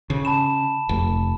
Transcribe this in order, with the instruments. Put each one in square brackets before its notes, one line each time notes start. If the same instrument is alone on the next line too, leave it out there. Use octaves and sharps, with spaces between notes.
[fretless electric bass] C#3
[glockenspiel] A5 B5 E7
[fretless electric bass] F1